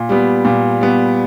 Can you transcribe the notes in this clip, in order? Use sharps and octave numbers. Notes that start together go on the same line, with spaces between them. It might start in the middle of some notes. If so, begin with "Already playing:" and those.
Already playing: A#2
G3 B3
A#2
G3 B3